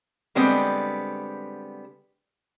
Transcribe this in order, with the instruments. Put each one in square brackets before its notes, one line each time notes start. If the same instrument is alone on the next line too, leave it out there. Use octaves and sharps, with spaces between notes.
[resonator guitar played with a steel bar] D3 G3 G#3 B3 C4